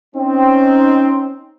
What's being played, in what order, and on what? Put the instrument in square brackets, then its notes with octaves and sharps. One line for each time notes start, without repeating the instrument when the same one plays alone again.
[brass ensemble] C4 C#4 D#4